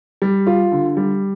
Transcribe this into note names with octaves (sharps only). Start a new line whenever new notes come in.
G3
F4
D3
G3